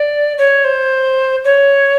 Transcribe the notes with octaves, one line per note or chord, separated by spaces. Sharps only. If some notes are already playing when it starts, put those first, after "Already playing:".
Already playing: D5
C#5
C5
C#5